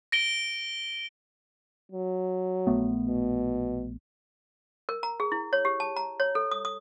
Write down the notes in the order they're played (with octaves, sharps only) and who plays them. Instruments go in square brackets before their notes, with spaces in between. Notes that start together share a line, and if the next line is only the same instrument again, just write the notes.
[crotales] A#6 D7 G7
[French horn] F#3
[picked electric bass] A#1 A3 B3
[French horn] B2
[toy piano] A#4
A#5
G#4
E4
C#5
G4
A5
A#5
C#5
A4
D#6
D#6